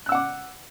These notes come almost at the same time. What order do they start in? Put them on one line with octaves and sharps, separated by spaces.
F#6 E6 F#5 D6